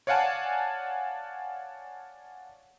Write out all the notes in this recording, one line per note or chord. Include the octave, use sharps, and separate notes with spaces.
C#5 D5 F5 F#5 G#5 A5